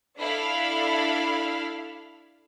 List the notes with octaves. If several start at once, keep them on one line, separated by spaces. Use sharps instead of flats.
D4 E4 A4 F5 B5